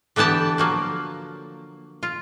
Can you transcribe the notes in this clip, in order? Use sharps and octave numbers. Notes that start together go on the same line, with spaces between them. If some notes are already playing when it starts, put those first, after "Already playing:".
D3 E3 B3 G4 A5
F3 F#3 A#3
F4